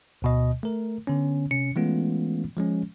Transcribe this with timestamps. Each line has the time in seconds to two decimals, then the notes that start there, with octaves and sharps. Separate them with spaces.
0.22 D2 B2 D#5
0.63 A3 A#4
1.07 D3 B3 C#4
1.51 C3 C#4 C#7
1.76 E3 G#3 A3 B3 C#4 F4
2.57 F3 G#3 C#4